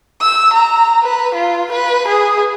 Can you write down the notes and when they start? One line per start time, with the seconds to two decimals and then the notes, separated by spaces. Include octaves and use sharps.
0.22 E6
0.54 A#5
1.03 B4
1.35 F4
1.72 B4
2.08 G#4